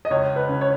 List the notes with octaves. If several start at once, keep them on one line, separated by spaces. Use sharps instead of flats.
D#5
C#2 C#5
B4
C#3
C#5